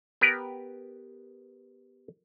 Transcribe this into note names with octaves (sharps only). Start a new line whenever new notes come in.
B3 G4 A#4 B4